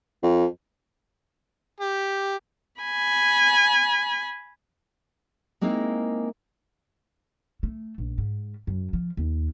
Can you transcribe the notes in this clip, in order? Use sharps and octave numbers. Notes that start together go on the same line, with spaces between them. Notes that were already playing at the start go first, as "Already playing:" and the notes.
F2
G4
G#5 B5
G#3 A#3 C4 D#4 E4 F5
A3
A#1
G#2
F#2
F3
D#2